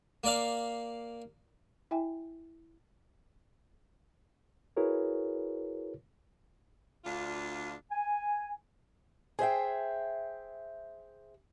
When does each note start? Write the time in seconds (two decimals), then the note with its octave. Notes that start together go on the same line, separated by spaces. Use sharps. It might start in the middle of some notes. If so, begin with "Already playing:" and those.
0.24 A#3 D5 F5
1.91 E4 E5 G5 G#5
4.77 E4 F#4 G#4 A#4 B4 C#5
7.04 D2 D4 F4
7.91 G#5
9.39 G#4 C5 E5 G5